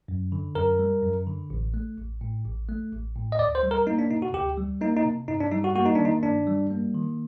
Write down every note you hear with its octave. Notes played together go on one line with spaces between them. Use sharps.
F#2
D3
F#2 A#4
G3
F#2
D3
A1
A3
A1
A2
A1
A3
A1
A2
D#5
D2 D5
C5
G3
A#4
A#3 D#4
D4
C3 D#4
F#4
D2 G4
G3
A#3 D#4
D#4
C3
G2 D#4
D4
G3 D#4
F#4
A#3 F#4
D#4
D#3 D4
D#4
G2 D4
G3
A#3
D#3